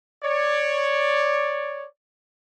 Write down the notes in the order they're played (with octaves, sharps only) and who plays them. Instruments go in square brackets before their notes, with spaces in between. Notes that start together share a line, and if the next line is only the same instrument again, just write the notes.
[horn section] C#5 D5